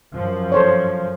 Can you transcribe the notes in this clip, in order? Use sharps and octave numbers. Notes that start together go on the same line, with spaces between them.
F#2 F3
A4 C5 C#5